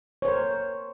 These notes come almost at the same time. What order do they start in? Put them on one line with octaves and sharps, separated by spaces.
C#5 C5 A#4